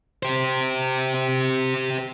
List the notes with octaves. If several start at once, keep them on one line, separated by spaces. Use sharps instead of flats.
G4 C5